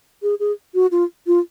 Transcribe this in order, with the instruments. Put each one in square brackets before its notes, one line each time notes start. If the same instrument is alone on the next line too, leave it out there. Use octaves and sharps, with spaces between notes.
[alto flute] G#4
G#4
F#4
F4
F4